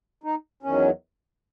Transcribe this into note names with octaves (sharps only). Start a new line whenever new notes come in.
D#4
E2 D#3 F#3 C#4